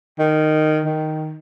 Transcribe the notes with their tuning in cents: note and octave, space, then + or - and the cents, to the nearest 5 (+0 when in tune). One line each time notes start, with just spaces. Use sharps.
D#3 -10
D#3 +0